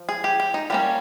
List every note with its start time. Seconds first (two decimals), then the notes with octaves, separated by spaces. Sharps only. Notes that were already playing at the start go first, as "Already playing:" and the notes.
Already playing: F3
0.09 G#4
0.24 G4
0.40 G4
0.54 D#4
0.70 G3 A#3 C#4 G4